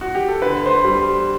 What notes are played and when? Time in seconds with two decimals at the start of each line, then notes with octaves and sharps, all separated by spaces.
0.01 F#4
0.15 G4
0.28 A4
0.42 D3 B4
0.66 C5
0.70 B4
0.85 G3